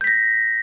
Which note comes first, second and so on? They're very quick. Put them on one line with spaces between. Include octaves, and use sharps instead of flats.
G6 B6 A#6